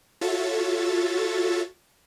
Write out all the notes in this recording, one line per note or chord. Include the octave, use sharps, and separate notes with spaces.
F4 F#4 A4 C#5 E5 A6